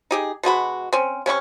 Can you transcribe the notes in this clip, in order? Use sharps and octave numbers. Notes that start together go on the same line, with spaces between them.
D#4 G4 G#4
B2 G#3 F#4 B5
C4 C#4
C3 C#4 E4 C#6